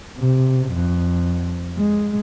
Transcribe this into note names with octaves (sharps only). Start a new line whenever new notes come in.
C3
F2
G#3